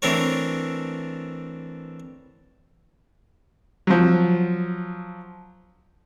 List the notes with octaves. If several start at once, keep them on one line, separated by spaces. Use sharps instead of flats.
E3 A3 C4 D4 A#4 C#5
F3 F#3